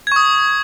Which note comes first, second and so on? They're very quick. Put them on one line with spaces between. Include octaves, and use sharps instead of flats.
G#6 C#6 D#6